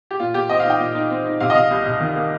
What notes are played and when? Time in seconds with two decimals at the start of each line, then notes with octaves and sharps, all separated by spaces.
0.11 G4
0.19 A#2 F4
0.34 A#2 G4
0.49 C4 D#5
0.60 F5
0.65 D#4
0.70 G5
0.80 A#2
0.95 D#4
1.10 C4
1.25 D#4
1.40 C3 F5
1.50 D#5
1.55 C3 F5
1.71 C2
1.86 C3
2.00 D#3
2.16 A#3